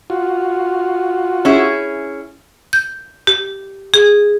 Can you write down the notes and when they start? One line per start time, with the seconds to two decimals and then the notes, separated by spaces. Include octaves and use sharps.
0.10 F4 F#4
1.45 C#4 E4 G#4
2.73 G6
3.27 G4
3.94 G#4